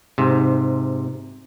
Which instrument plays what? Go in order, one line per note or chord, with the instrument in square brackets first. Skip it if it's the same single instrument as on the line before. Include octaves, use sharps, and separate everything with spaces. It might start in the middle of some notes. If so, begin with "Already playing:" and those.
[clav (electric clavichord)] G#2 C3